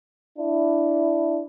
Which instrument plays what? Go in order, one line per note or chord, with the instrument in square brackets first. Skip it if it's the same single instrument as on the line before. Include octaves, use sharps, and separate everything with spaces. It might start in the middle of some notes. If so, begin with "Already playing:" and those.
[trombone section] D4 E4